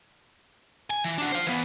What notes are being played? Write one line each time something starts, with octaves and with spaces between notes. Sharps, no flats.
G#5
E3
D4 F#4
C5 F5
E3 B3